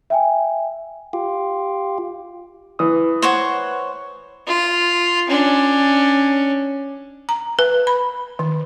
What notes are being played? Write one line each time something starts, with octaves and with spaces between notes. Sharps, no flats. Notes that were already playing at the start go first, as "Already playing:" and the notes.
E5 G5 G#5
F4 G4
E3 D#6
C5 C#5 F#5
F4
C#4 D4
A#5
B4
B5
D#3